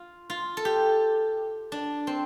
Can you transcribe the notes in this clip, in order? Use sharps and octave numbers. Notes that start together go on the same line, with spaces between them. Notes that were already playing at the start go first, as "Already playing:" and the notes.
Already playing: F4
F4
A4
G4
D4
C4